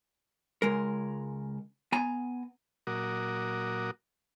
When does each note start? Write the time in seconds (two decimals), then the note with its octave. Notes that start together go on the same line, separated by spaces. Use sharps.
0.62 C#2 G#3 A#4
1.92 B3 G#5 A#5
2.87 A#2 F#3 F#4 A#4 D6 D#6